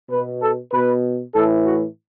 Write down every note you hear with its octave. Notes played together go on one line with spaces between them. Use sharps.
B2 B4
A4
B2 B4
A2 E3 A4
F#4